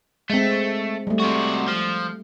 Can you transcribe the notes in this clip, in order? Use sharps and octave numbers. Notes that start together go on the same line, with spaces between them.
G#3 A3 C4
G3 A3
C3 F#4
F3